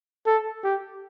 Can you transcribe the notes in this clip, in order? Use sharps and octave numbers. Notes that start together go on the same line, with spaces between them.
A4
G4